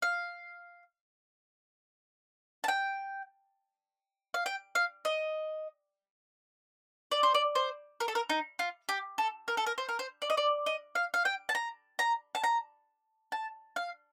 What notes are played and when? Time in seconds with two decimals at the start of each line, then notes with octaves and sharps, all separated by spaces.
0.02 F5
2.64 A5
2.68 G5
4.34 F5
4.46 G5
4.75 F5
5.05 D#5
7.12 D5
7.23 C5
7.35 D5
7.55 C5
8.00 A#4
8.08 A4
8.15 A#4
8.29 D#4
8.59 F4
8.89 G4
9.18 A4
9.48 A#4
9.57 A4
9.66 A#4
9.78 C5
9.89 A#4
9.99 C5
10.22 D5
10.30 D#5
10.37 D5
10.66 D#5
10.95 F5
11.14 F5
11.25 G5
11.49 A5
11.55 A#5
11.99 A#5
12.35 A5
12.44 A#5
13.32 A5
13.76 F5